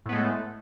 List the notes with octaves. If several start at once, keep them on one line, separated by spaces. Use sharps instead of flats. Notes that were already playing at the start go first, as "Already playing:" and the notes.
A2 G#3 A3 B3